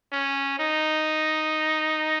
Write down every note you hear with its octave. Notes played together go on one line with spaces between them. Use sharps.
C#4
D#4